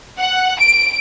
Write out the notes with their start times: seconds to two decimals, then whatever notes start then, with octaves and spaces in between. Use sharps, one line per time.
0.19 F#5
0.60 D7